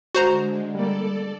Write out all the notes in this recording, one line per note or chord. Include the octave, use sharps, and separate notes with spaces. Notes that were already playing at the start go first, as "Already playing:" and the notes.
D3 G#3 F#4 C5 A#5
G3 A#3 A4 D5